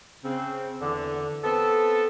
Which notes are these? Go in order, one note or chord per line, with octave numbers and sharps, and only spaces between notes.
C#3 C4
E2 D3
B3 C4 A4